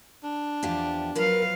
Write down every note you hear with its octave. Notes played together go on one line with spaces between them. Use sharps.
D4
E2 F3 G4
F3 F#3 A#4 B4 F5